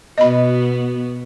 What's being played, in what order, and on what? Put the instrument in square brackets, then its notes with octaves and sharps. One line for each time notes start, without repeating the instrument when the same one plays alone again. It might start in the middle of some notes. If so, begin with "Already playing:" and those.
[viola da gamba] B2 B3 F#4 [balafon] D#5 B5